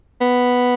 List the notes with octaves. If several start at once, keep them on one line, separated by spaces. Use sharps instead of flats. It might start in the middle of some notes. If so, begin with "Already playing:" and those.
B3